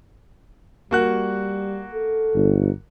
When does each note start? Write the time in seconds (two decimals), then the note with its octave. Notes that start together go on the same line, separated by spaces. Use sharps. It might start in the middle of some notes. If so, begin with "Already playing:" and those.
0.91 G3 A#3 F#4 F#6
1.94 A4
2.34 G1